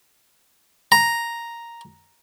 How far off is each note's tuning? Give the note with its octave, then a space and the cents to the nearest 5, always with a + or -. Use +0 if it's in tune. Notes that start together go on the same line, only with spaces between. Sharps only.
A#5 +0